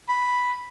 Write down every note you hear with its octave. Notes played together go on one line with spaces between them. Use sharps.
B5